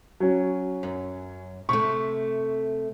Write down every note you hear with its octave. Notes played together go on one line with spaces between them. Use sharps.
F#3 C#4
F#2
C3 A3 C#6